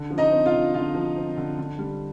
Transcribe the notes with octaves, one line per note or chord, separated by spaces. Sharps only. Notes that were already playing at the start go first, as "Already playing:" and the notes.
Already playing: D3
F3
D#4 D#5
C4
F4 F5
D3
D3 F4 F5
F3
C4
D3
D3
G3